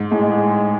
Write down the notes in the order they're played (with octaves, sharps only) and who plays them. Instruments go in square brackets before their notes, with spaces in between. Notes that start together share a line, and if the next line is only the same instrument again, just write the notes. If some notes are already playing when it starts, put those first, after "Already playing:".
Already playing: [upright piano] G#2
[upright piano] A2 [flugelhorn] G#3